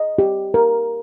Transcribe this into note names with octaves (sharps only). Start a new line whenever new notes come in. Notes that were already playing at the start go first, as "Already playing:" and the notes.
Already playing: D#5
G4
A#4